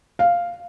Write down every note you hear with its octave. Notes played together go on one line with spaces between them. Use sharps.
F5